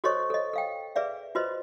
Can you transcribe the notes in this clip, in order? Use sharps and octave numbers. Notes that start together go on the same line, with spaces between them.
F#4 A4 C5 C#5 D#5 C#6
A4 D#5
A4 F5 G5
G#4 B4 D5 E5 F5
F4 F#4 B4 C5 D#5